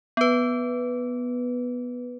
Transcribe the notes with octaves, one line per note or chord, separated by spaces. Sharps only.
B3 B4